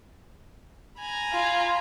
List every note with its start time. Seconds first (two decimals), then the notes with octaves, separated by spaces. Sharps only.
0.98 G#5 A#5 B5
1.32 F4